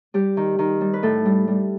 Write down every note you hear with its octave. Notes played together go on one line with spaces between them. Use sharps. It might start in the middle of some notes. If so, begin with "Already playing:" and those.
G3 G4
D#3
D#3
G3
B4
A2 A4
G3
G3